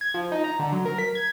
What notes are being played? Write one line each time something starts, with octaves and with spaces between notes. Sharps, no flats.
G#6
F3
D#4
A#5
D3
F#3
A#4
B6
G#6